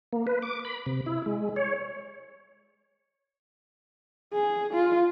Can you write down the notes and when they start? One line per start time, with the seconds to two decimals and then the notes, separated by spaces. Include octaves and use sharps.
0.13 A#3
0.27 B4
0.42 D6
0.65 B5
0.86 C3
1.06 E4
1.26 G#3
1.56 C#5
4.33 G#4
4.74 F4